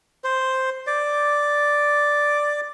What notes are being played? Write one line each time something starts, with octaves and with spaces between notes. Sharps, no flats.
C5
D5